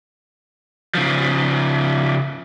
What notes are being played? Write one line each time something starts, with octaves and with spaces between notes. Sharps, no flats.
C#3 F3